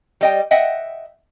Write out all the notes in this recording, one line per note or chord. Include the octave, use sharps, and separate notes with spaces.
G3 D#5 G5
D#5 E5 F#5 G5